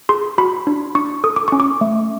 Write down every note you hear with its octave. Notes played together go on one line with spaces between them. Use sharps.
G#4 C6
F#4 B5
D4
D4 C#6
A4 D#6
D6
C#4 C#6
D6
A3